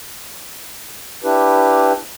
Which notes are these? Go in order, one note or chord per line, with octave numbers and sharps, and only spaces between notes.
D4 E4 G4 B4